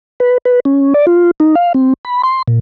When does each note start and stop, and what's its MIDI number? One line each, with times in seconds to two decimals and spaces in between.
0.20 0.38 71
0.45 0.60 71
0.65 0.94 61
0.94 1.06 74
1.07 1.31 65
1.40 1.55 63
1.55 1.73 77
1.74 1.93 60
2.05 2.22 83
2.23 2.42 84
2.48 2.59 46